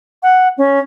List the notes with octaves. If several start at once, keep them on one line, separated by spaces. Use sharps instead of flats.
F#5
C#4